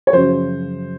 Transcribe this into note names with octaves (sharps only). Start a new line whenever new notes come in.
C#5
F#2 C#3 F3 C5